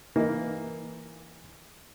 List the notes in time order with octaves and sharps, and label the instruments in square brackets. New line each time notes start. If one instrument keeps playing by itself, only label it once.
[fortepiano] E3 A#3 D#4